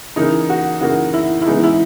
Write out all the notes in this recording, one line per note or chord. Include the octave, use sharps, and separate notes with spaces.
C#3 E3 A#3 D#4
F#4
C#3 E3 A#3 F#4
E4
E4
C#3 E3 G#3 B3 D#4
E4